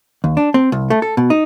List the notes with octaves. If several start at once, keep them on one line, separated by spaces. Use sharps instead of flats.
D#2
D4
C4
C2
A3
A4
B2
D#4